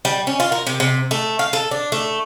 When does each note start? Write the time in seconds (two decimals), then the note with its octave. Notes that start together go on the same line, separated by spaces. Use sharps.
0.05 G3
0.27 C#4
0.40 F4
0.52 A#4
0.67 C3
0.80 C3
1.11 A3
1.39 F5
1.53 A4
1.71 D4
1.92 A3